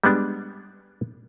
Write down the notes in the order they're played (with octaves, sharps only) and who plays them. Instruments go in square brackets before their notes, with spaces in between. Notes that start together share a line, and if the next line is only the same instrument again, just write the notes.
[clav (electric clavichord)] G3 G#3 B3 D4